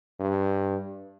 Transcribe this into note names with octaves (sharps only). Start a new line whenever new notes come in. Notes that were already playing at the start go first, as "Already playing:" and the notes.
G2